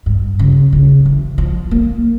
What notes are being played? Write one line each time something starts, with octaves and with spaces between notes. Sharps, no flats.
G2
C#3
C#3
E3
F3
A#3